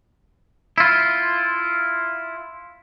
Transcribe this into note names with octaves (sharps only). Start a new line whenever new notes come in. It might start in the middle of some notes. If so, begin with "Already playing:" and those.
E4 F4